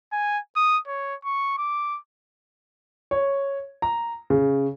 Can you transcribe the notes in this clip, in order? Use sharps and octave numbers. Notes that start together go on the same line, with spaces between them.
G#5
D#6
C#5
C#6
D6
C#5
A#5
C#3